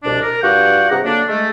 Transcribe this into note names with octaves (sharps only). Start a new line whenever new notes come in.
C2 F2 B2 D4
A#4
G2 F4 F#4 D5 F#5 G5
G2 C3 G#4 F#5 A#5
D3 F#3 A#3 D4
G#3 A3